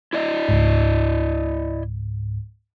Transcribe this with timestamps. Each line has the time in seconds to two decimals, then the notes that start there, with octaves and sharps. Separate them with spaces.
0.13 E4 D5 D#5
0.49 C#2 G#2